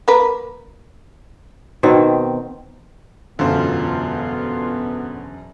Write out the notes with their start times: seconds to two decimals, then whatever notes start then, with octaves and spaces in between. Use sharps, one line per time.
0.08 A#3 A#4 B4
1.83 B2 D#3 C4
3.39 E1 F#2 D3 B3 F4 C5